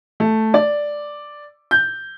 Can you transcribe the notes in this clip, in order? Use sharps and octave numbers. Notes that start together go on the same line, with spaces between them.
A3
D5
G6